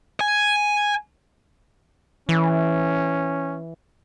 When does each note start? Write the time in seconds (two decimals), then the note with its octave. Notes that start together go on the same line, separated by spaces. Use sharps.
0.21 G#5
2.29 E3 C#4